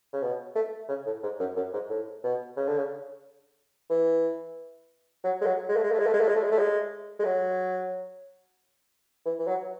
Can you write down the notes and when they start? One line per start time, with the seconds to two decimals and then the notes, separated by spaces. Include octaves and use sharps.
0.13 C#3
0.22 B2
0.55 A3
0.89 C#3
1.06 A2
1.23 G#2
1.39 F#2
1.56 F#2
1.73 G#2
1.89 A2
2.23 B2
2.56 C#3
2.67 D3
2.78 C#3
3.90 E3
5.24 F#3
5.41 G#3
5.46 F#3
5.68 G#3
5.76 A3
5.84 G#3
5.91 A3
5.99 G#3
6.06 A3
6.13 G#3
6.20 A3
6.28 G#3
6.35 A3
6.43 G#3
6.51 A3
6.58 G#3
7.19 G#3
7.25 F#3
9.25 E3
9.39 E3
9.47 F#3